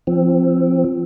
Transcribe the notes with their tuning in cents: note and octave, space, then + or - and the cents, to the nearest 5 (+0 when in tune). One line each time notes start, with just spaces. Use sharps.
F3 -15 C4 +0